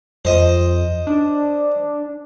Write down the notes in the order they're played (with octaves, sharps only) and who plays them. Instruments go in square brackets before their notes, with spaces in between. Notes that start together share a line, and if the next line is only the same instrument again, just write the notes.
[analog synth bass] F2 [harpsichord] C5 D#5
[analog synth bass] D4